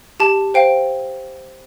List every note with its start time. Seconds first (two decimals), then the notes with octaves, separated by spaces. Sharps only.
0.20 G4 A5
0.54 C5 F5 G5